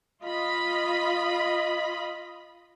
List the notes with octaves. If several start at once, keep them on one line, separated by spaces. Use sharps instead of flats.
F4 D#5 B5